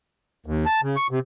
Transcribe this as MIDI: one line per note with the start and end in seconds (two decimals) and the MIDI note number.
0.46 0.65 39
0.66 0.81 81
0.83 0.96 49
0.96 1.07 85
1.11 1.19 48